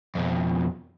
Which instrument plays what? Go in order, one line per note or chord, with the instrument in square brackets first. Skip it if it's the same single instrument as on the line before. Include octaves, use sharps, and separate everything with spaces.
[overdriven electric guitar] F2 B2